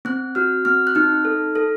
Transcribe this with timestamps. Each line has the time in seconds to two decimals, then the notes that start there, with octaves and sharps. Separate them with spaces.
0.05 C4 F#6
0.35 F#4 F6
0.65 C4 F6
0.87 F#6
0.95 D#4 F6
1.25 A4
1.55 A4